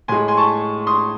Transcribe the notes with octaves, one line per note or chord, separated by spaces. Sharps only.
A2 G#3 G#5 C6
G#5 C6
A5 C#6
C6 D#6